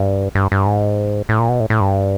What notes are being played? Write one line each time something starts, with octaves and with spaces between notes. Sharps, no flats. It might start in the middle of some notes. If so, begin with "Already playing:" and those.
Already playing: G2
G2
G2
G#2
A2
A#2
B2
A2
A2
G2